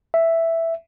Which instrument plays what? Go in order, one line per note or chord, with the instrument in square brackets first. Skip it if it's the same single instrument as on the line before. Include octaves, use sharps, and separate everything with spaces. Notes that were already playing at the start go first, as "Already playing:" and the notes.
[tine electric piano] E5